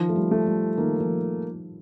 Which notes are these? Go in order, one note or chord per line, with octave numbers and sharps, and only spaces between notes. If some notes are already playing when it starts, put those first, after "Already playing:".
Already playing: D#3 F3
A3
G3
A3
G3
D#3 A#3
F3